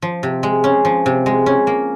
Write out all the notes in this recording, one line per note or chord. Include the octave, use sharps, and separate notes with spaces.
F3
C3
G#3
C#4
F3
C3
G#3
C#4
A#3